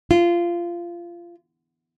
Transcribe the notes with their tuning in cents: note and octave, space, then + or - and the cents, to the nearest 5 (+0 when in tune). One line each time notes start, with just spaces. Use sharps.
F4 -20